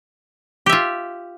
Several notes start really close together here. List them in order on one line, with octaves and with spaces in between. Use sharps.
G4 E5 F4